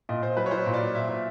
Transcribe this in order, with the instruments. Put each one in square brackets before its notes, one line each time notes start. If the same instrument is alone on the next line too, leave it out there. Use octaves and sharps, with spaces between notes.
[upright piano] A#2 D#5
A#2 C5
F#3 B4
C#5
F#3 C5
A#2
D5
A#2
A#2 E5
A#2